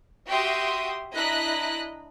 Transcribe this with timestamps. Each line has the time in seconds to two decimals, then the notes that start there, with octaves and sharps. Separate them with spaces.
0.27 F#4 G4 E5 G5 C6 D#6
1.14 D4 E4 D#5 A#5 F#6 B6